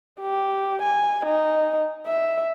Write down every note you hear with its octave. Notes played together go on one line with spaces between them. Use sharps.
G4
G#5
D#4
E5